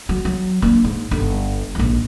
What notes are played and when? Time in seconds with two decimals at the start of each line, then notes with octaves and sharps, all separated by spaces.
0.09 F#3
0.25 F#3
0.62 A#3 D4
0.84 G#2
1.11 G1 G2
1.75 A#1 G#2